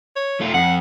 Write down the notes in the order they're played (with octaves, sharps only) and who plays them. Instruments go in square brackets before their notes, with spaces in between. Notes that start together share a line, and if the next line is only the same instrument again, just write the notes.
[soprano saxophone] C#5
[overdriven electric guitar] A3 F4
[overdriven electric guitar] F2 [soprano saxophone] F#5